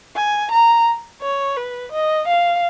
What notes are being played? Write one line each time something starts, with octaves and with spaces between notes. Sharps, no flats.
G#5
A#5
C#5
B4
D#5
F5